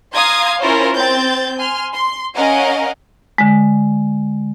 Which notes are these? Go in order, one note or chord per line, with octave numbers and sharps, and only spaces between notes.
F5 A#5 C6 D#6 G#6
C#4 E4 F4 A#4 C5 C#5
C4 G6 A6
G#5 C6 F6
C6
C#4 A#4 D#5 F5 F#5 G#5
D3 G#3